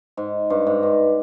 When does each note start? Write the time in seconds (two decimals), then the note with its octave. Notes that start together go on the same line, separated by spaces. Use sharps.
0.17 G#2
0.50 G2
0.67 G#2
0.83 G2